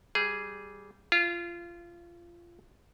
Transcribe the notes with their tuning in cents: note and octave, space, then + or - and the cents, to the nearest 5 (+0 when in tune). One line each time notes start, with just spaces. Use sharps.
G3 -15 G#4 +0
F4 -20 F5 -35